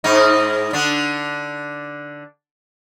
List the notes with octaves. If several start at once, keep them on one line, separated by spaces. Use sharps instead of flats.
G#2 D#4
D3 D4